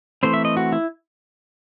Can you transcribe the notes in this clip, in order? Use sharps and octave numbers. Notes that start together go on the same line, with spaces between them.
E3 A3 C4 C5
E5
D#5
F#4
E4